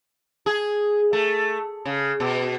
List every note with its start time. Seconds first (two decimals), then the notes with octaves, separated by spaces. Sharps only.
0.46 G#4
1.13 A3
1.85 C#3
2.20 B2